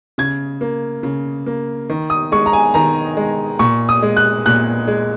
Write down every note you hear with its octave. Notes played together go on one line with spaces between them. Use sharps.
C#3 G#6
A#3
C#3
A#3
D#3
D#6
G#3 C#6
A#5
G#5
D#3 A#5
G#3
A#2 C#6
D#6
G#3
F#6
A#2 F#6
G#3